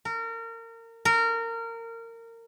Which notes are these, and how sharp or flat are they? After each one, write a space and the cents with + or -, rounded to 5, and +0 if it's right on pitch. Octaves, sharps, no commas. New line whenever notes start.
A#4 -30
A#4 -25